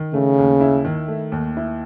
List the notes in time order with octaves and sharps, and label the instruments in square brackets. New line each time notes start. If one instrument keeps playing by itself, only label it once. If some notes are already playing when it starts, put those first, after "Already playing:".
Already playing: [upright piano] D#3
[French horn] C#3 [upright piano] A3
[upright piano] D#2
E4
D#3
A3
D#2
E4